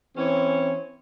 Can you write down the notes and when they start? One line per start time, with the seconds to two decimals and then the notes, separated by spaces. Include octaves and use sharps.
0.17 E3 C4 C#4 C#5